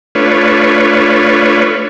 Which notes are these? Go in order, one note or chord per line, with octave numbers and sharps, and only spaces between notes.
A3 D4 F4 B4 C#5